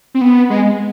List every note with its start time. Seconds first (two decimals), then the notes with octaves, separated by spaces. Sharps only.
0.14 C4
0.21 B3
0.50 G#3